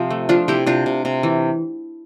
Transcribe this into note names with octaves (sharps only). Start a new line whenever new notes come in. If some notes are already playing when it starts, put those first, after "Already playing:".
Already playing: C3 F3
A3
F3 D4 F4
C3 E4 G4
C3 D4 F4
C3
C3
E3